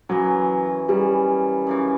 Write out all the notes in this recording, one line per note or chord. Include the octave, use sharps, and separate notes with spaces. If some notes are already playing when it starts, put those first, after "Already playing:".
F#2 C#3 E3 F#3
F#2 C#3 E3 G3
F#2 C#3 E3